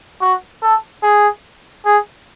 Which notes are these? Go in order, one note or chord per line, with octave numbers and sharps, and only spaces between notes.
F#4
A4
G#4
G#4